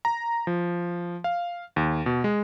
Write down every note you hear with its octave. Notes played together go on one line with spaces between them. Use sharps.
A#5
F3
F5
D#2
B2
G#3